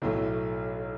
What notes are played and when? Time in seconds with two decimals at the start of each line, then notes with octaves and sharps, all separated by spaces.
0.02 B1 A2 F#3 A3